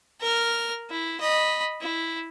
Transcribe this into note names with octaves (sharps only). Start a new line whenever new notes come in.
A#4 F6
E4
D#5 B5
E4